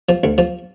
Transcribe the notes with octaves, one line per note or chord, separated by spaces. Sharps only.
F3
D2
F3